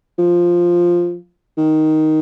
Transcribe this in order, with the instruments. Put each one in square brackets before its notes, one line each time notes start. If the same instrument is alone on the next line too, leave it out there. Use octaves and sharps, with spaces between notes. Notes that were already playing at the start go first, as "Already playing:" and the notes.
[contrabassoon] F3
D#3